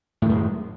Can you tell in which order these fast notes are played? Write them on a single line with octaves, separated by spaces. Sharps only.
A2 D#3 F#2 G#3